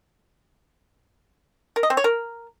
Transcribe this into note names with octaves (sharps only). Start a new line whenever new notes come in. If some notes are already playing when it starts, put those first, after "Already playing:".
A#4
D#5
C4
C#5
A#4